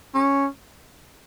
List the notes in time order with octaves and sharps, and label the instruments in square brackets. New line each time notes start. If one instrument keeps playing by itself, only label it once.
[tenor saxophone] C#4